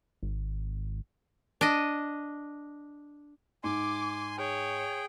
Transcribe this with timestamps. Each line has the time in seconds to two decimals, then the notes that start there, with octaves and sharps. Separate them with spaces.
0.23 G#1
1.61 D4 D#5
3.64 G#2 G#5 C6 D6
4.38 G#4 C#5 G5